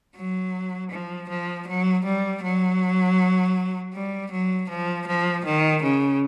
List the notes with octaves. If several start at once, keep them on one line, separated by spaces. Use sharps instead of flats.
F#3
F3
F3
F#3
G3
F#3
G3
F#3
F3
F3
D#3
C#3